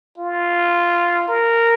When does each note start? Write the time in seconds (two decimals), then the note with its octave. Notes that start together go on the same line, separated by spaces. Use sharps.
0.18 F4
1.28 A#4